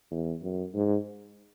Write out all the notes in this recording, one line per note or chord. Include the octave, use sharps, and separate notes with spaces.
E2
F#2
G#2